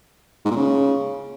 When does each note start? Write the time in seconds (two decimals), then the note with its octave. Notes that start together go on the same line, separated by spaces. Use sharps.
0.45 G#2
0.51 A#2
0.56 C#3